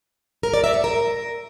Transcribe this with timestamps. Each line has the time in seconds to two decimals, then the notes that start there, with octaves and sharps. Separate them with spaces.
0.43 A#4
0.54 D5
0.64 E5
0.74 C#5
0.84 A#4